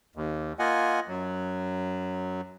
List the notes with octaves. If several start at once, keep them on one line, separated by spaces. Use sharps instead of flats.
D#2
A#3 F4 D#5 F#5 G#5
F#2 F#3